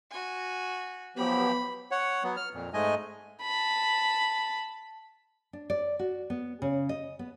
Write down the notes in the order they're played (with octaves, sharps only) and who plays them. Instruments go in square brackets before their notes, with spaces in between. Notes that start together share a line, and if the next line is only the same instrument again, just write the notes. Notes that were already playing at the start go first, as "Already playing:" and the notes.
[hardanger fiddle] F#4 G#5
[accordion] F3 F#3 G4 [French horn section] B3 [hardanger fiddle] B5
[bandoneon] C#5 F#5
F#3 B3
F6
F2 A#2
G#2 G#3 A3 D#5 G#5
[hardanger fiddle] A5 B5
[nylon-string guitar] D4
D5
F#4
B3
C#3
D#5
B3